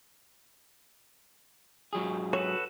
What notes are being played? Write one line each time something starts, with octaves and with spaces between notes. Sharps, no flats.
G#2 F#3 G#4
F#4 A4 B4 C#5